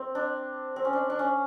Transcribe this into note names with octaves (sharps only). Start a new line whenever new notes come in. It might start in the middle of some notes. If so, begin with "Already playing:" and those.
Already playing: C4
D4
C4
C#4
D4
D4
C#4